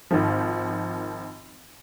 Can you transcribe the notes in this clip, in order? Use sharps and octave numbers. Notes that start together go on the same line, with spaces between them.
G#1 D#3 F3